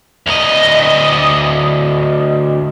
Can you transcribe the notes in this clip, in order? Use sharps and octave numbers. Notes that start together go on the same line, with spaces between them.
D2 D#5